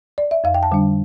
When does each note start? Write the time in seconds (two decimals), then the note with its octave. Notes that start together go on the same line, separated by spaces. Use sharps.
0.18 D5
0.31 E5
0.44 F2 F5
0.54 G5
0.63 A5
0.72 D3 G3 D4